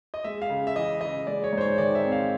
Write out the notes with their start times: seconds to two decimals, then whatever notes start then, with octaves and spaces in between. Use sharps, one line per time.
0.14 D#5
0.24 G#3 E5
0.42 F5
0.50 C#3
0.67 E5
0.76 E3 D#5
1.01 C#3 D#5
1.27 G#3 D5
1.44 C#5
1.53 G#2 C5
1.61 C#5
1.78 D#3 D5
1.95 E5
2.04 C4
2.12 F5